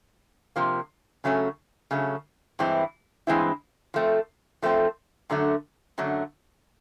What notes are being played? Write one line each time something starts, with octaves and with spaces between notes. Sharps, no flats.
C3 F3 A#3
C#3 F#3 A3 C#4
C#3 F#3 A3 C#4
G2 E3 G#3 C4 E4
G2 E3 G#3 C4 E4
F3 A3 C4
F3 A3 C4
F#2 D3 F#3 A3
F#2 D3 F#3 A3